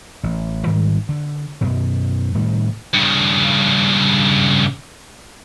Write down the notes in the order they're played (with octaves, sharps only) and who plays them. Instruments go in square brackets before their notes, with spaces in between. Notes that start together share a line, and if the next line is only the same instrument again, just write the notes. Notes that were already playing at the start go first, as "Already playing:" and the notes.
[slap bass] A1
G#2 D#3 G3 G#3
D3
F#2 B2
A2 D#3 G3
[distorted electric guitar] G2 C#3